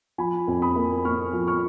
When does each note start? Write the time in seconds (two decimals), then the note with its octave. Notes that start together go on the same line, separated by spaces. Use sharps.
0.18 F3 G#5 B5
0.47 F2
0.62 B5 D#6
0.76 A#3
1.05 A#3 C#6 F6
1.33 F3
1.47 C#6 F6